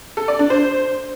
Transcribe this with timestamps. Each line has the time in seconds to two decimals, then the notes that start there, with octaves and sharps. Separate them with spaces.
0.17 A4
0.28 D5
0.39 D4
0.50 C5